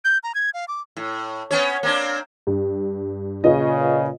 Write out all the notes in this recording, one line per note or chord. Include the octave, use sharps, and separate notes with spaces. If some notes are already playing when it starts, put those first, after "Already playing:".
G6
A#5
G#6
F5
D6
A2
B3 C#4 C#5
A#3 C4 D4
G2
A#2 C#3 F4 B4 D#5